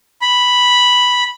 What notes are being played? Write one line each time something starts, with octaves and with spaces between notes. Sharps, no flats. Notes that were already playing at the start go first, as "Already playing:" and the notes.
B5